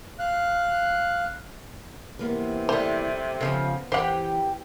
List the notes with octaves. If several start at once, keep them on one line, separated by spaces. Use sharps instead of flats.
F5 F#6
C3 E3 A#3 B3
G3 A3 C5
C#3 E3 F3 B3 C4 A4
E3 G4 C5 F#5 G5